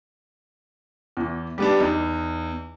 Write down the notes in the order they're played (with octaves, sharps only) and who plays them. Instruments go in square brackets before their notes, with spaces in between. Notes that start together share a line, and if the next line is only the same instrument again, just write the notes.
[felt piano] E2 E3
[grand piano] G3 B3 D4 [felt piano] G4
[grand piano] E2 [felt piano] D#4